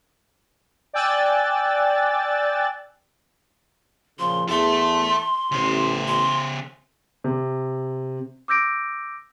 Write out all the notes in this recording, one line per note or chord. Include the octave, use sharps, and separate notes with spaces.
D5 G5 G#5 E6 F#6 A6
A#2 C#3 F3 C6
E2 A4 E5 C6
A1 C#3 C5
C6
C3
D6 E6 G6 A#6 D7